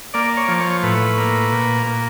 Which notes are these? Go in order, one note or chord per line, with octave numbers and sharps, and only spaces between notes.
A#3 D5
C#5
F3
C#5
A2 B4
A#3
A#2
A#3